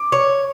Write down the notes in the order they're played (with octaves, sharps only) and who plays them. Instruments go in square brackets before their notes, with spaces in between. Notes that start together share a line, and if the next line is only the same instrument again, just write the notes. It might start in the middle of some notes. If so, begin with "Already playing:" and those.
Already playing: [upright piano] D6
[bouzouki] C#5